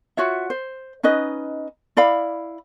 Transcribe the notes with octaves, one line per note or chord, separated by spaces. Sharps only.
F4 F#4 C#5 E5
C5
C#4 D#4 B4 D#5
E4 D5 F5 B5